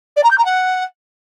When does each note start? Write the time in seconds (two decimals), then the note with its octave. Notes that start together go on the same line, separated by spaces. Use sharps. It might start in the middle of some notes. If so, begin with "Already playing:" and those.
0.16 D5
0.23 A#5
0.31 G6
0.38 A#5
0.45 F#5